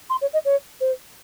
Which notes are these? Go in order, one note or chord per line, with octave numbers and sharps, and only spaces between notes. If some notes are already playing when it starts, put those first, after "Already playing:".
C6
C#5
D#5
C#5
C5